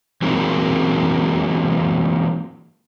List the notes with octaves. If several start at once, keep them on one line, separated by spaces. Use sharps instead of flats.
E3 F#3 G#3 A#3 C4 D#4